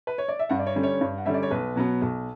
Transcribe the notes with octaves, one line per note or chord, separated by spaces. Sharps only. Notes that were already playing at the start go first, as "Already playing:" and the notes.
B4
C#5
D5
E5
G2 F#5
D5
C#5
D3 G3 C#4
C#5
G2
F#5
D3 G3 C#4 E5
D5
C#5
B1 B4
B2 F#3 B3
B1